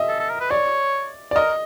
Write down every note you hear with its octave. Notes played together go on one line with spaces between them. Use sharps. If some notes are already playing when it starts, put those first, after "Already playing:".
Already playing: D#5 E5
A4
A4
A#4
B4
C#5 D5
D5
A#4 D#5